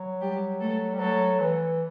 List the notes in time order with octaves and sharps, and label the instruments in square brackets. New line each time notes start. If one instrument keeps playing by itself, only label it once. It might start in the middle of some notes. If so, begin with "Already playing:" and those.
Already playing: [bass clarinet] F#3
[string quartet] G3 G4
A3 A4
[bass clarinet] G3
[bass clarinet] F#3 [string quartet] A3 A4
[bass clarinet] E3